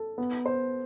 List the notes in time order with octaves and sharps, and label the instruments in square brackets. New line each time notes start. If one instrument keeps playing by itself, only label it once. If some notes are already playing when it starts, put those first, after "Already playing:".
Already playing: [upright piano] A4
B3
C5